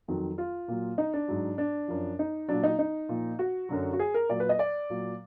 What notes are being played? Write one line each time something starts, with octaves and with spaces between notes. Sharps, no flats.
F2 D#3 F#3
F4
A#2 F#3
D#4
D4
G#2 F#3
D4
F#2 F3
D#4
A#2 F#3 D4
D#4
D#4
A#2 F3
F#4
F#2 D3 F#3
F#4
G#4
A#4
A#2 F#3 D5
B4
D#5
D5
A#2 F#3